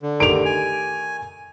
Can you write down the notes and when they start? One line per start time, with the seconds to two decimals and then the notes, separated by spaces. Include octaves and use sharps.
0.02 D3
0.20 D#3 A3 G4 D7 F7
0.46 G#5